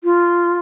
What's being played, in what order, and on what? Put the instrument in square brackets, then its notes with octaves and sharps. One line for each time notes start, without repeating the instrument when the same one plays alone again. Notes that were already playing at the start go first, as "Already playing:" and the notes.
[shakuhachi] F4